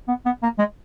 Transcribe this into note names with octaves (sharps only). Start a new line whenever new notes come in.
B3
B3
A#3
G#3